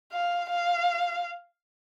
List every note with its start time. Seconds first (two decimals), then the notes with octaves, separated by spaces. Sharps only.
0.12 F5
0.49 F5